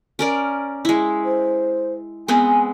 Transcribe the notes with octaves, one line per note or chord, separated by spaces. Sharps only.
C#4 A#4 D5
G#3 E4
C5
G#3 B3 C4 G#5